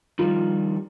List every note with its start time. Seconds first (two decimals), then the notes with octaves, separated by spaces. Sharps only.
0.19 D#3 F3 G3 F4